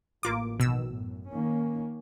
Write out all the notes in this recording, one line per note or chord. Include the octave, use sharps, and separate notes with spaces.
A1 A#3 F4 D6
A#1 B2 D#3 E6
F#2 A2
D#3 A#3 C#4